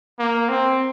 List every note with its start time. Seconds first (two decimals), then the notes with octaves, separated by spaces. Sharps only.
0.19 A#3
0.49 C4